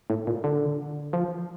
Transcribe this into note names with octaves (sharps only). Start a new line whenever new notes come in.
A2
A#2
D3
F3